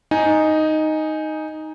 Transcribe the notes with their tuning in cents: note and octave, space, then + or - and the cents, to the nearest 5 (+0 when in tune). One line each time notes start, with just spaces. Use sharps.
D#4 +0 G#5 +0